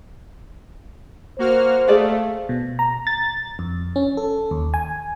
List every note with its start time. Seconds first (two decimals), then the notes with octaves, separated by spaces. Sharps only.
1.39 A#3 F#4 C5 F6
1.88 A3 G#4 D5 F5
2.49 B2
2.79 A#5
3.07 A6
3.59 F2
3.96 C#4
4.17 A4
4.51 D#2
4.74 G#5